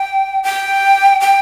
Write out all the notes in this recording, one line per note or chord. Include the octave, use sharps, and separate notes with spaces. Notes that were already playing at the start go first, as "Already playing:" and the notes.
Already playing: G5
G5
G5